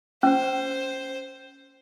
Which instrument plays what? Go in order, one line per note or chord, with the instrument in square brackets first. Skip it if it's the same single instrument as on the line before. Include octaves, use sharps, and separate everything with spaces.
[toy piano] C#4 [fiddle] C5